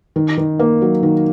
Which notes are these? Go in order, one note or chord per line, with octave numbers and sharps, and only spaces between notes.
D#3
D#3
A#3
F#3
D#3